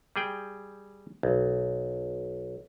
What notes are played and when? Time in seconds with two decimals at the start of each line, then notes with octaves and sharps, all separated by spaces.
0.16 G3 G#4 G5
1.23 B1